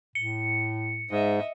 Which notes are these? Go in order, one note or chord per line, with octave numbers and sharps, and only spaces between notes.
A2 C#7
G#2 D#5 E5